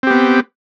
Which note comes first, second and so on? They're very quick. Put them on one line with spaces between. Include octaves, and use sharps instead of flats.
C4 G4 B3